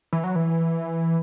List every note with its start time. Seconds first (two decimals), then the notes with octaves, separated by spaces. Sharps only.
0.13 E3
0.24 F#3
0.36 E3